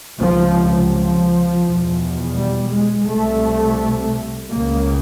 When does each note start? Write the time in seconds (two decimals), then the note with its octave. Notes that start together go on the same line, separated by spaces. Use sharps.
0.19 C#2 F3
0.24 C3
0.91 F3
1.64 E2 B2
2.35 G3
2.70 G#3
3.07 C2 C3 A3
4.50 C#2 C#3 A#3